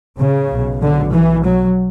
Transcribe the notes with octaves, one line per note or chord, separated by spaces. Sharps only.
C#3
B1 B2
D3
E3
F#3